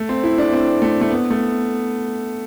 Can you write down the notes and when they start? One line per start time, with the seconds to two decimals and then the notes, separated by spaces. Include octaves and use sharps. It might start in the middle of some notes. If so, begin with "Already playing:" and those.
Already playing: A3
0.09 C4
0.24 E4
0.38 D4
0.53 C4
0.82 A3
1.01 A3
1.11 B3
1.31 A3